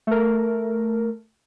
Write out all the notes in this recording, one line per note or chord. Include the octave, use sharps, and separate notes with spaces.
A3 A#4